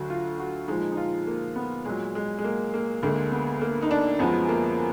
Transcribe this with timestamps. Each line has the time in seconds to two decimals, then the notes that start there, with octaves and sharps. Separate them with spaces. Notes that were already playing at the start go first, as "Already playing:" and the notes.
Already playing: D2 D3 F#3 F#4
0.10 F4
0.39 F#4
0.68 A#2 F3 G#3 D#4
0.92 D#4
0.97 F4
1.27 A#3
1.56 B3
1.85 A#2 F#3 G#3
2.15 G#3
2.39 G#3
2.44 A#3
2.74 A#3
3.03 D2 D3 G#3 A#3
3.31 B3
3.62 A#3
3.82 D#4
3.91 D4
4.19 F#2 F3 G#3 B3
4.49 A#3